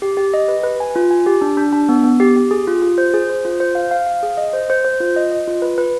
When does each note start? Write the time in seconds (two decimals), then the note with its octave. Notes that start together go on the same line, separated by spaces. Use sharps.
0.02 G4
0.17 G4
0.34 D#5
0.48 B4
0.64 B4
0.80 G#5
0.96 F4
1.11 G#5
1.26 G4
1.41 D4
1.57 D4
1.73 D4
1.89 B3
2.04 B3
2.20 G4
2.36 G4
2.51 G#4
2.67 F4
2.82 F4
2.98 C5
3.14 G#4
3.30 C5
3.45 F4
3.60 C5
3.75 F5
3.91 F5
4.07 F5
4.23 G#4
4.37 D#5
4.53 C5
4.70 C5
4.85 C5
5.01 F4
5.16 D#5
5.32 D#5
5.48 F4
5.62 B4
5.78 B4